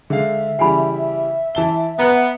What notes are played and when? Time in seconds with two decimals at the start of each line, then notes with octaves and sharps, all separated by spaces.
0.10 D3 G#3 E5 F5
0.59 C#3 E3 G3 F#5 G#5 B5
1.55 E3 A5 G7
1.99 B3 A#5 F#6